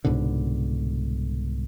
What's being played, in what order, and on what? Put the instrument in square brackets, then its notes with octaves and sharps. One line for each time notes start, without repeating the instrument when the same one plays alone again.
[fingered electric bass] C2 G#2 B2 D3